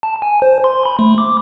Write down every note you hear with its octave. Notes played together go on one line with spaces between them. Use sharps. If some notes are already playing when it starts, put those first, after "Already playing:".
A5
G#5
C5
C6
B5
A3
D6